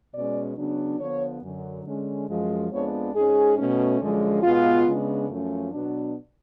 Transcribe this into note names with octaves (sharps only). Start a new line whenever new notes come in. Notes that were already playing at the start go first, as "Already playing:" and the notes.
B2 G#3 C#4 D5
C#3 F#3 B3 D4
D3 F3 B3 C#5
F#2 D3 F#3
D3 G#3 C#4
F#2 F3 G#3
F2 F3 G#3 B3 D4 C#5
G#2 G#3 C#4 G#4
B2 A3 C#4
F#2 D3 F3 G#3 C#4
B2 G#3 B3 F4
C#3 G#3 B3 D4
F#2 F3 A3 C#4
B2 F#3 B3 D4